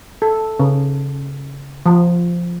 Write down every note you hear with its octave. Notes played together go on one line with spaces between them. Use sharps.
A4
C#3
F3